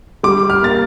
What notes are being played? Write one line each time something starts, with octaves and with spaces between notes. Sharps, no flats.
G3 D6
F6
A#3 A6